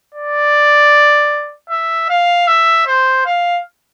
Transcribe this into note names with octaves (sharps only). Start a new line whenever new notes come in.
D5
E5
F5
E5
C5
F5